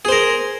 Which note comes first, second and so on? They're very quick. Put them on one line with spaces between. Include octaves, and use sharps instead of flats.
G#4 C5 A#4